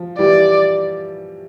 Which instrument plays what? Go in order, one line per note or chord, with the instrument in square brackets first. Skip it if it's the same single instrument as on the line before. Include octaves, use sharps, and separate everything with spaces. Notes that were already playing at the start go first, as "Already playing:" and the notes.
Already playing: [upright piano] F3
[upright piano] E3 G3 [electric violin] D5